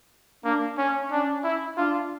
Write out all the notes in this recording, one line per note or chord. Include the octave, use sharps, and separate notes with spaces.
A#3 D4
C#4
C#4 D4
E4
D4 F4